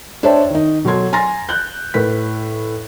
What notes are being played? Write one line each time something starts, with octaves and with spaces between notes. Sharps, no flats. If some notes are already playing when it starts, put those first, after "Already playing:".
D4 C5 C#5 E5 G5 A5
D#3 D#4
B2 F#3 A4 C6 G#6
G#5 A#5 C6 A6 A#6
F#6 G6
A2 B4 B6